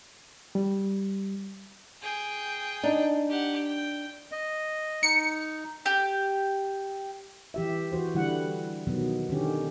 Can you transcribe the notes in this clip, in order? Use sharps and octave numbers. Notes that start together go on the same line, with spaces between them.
G3
G#4 G5
D4 D#4
G4 F#5
G5
D#5
D#4 C#7
G4
E3 G4 E5
E3 F#4 C5
D3 E3 G3 E4 F#5
B2 D#3 F#3 B3
D3 D#3 C#4 G4